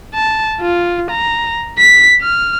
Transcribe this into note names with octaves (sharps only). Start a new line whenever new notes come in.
A5
F4
A#5
B6
F6